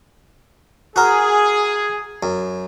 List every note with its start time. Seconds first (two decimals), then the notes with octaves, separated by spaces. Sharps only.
0.96 F#4 G#4 A#4
2.23 F#2